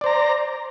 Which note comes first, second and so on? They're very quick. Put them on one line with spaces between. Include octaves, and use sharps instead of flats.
D5 C5 A#5